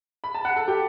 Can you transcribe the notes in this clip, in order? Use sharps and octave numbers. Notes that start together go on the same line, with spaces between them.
B5
A5
F#5
A4
G4